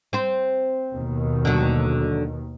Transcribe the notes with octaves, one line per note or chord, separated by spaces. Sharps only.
C4 C5
D#2 B2 D#3
D3 F#3